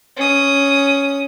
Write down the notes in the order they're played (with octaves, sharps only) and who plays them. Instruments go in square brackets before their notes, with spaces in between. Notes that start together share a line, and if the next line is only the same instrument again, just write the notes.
[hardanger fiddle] C#4 D#6